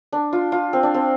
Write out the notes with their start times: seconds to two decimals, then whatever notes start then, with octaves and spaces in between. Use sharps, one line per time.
0.12 D4
0.33 F4
0.52 F4
0.73 C4
0.83 D4
0.94 C4